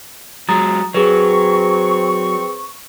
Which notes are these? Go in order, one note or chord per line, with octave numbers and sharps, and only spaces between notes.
F#3 G#3 A#5 D#6 A6
F#3 C4 G#4 B4 C#6